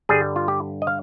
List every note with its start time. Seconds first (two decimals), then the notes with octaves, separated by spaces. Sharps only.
0.09 G2 D3 G3 G#4
0.36 F4
0.48 G4
0.82 D#5
0.87 F5